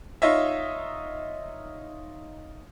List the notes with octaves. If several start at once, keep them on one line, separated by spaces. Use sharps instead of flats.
D#4 F4 C#5 D#5 E5